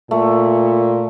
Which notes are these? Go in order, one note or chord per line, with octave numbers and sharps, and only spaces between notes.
A#2 A3